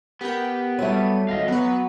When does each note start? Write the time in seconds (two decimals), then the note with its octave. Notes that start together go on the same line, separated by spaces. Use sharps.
0.21 B3 G4 A#4 G5
0.79 F#3 G3 A3 D#7
1.29 G#1 D#5 F5
1.48 F#3 B3 B4